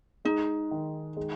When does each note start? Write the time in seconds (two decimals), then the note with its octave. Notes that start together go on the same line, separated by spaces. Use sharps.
0.25 G#3 D#4
0.71 D#3
1.17 G#3